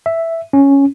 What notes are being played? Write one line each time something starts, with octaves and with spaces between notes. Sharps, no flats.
E5
C#4